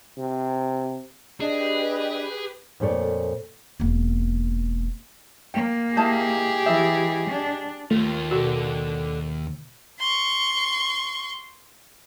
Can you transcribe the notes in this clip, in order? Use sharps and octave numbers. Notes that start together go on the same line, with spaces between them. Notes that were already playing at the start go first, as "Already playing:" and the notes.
C3
D4 G4 G#4 B4 D#5
F2 A#2 A3 C#5 D5
E1 A#3
A#3 G5
D#4 E4 G4 G#4 A5
E3 D#4 E5
D4
D#2 A3 F4
B2 F#4 A4 D5 F#5
C6 C#6